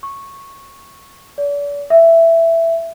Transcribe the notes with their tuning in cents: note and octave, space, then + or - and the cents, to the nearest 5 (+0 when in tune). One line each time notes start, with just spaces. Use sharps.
C#6 -10
D5 -40
E5 +10